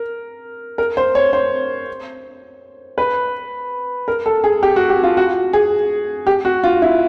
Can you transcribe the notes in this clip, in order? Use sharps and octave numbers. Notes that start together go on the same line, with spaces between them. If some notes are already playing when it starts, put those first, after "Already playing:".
Already playing: A#4
A#4
C5
C#5
C5
B4
A#4
A4
G#4
G4
F#4
G4
F4
F#4
G#4
G4
F#4
F4
E4